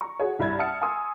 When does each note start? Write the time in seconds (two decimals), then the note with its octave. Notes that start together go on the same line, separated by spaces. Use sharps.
0.01 A#5 C#6
0.20 F#4 G#4 C#5
0.39 C2 G2 E4 G#6 A6
0.58 E5 F#5 A5 D#6 F6 C#7
0.82 G#5 A#5 C6 D#6 E6